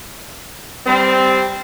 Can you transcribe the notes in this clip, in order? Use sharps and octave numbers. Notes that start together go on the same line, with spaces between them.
G3 C4